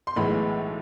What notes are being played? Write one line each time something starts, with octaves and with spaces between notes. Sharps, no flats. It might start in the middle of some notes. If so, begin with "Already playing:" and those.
C6
B1 A2 E3 G#3 B5